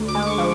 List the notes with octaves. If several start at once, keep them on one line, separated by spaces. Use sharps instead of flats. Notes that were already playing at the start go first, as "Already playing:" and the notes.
Already playing: D2
D6
G#3
D6
C#6
F3